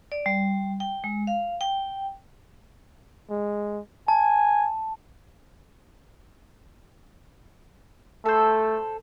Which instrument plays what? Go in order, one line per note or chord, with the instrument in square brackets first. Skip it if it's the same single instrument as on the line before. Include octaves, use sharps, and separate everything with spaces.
[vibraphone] D5
G3
G5
G#3
F5
G5
[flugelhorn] G#3
[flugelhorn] G#5 [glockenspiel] A5
[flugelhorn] A3 [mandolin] A4 C5